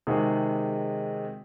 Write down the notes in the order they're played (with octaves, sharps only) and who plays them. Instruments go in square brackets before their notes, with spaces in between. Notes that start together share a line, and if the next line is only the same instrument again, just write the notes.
[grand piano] C3 D#3 G#3 D#4 F#4 G#4